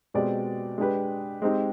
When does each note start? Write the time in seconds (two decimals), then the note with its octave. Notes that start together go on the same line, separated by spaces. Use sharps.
0.14 B2 G#3 C4 G4 D5
0.78 G#3 D4 G4 B4
1.42 G#3 C4 D#4 G4